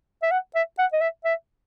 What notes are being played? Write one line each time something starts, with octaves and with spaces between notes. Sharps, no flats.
E5
F#5
E5
F#5
D#5
E5
E5